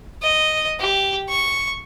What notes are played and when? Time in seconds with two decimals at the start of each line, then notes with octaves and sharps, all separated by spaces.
0.22 D#5
0.79 G4
1.29 C#6